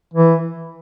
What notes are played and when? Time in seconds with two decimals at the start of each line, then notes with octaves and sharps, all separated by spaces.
0.14 E3